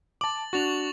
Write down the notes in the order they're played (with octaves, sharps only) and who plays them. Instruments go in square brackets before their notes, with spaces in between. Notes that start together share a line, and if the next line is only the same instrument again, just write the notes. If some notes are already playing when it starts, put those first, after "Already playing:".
[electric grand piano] A5 D6 [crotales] A6 F#7
[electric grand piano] D4 F#4 [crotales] C#6 A6 F7